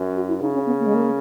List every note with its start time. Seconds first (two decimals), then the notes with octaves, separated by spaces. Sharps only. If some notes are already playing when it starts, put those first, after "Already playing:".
Already playing: F#2
0.16 F#4
0.28 E4
0.41 C#3 D#4
0.54 C#4
0.66 B3
0.79 A#3
0.86 G#3
0.94 A#3